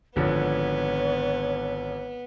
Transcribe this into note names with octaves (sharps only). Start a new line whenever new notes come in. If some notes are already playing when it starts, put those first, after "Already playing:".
G#1 D3 F3 B3 C#5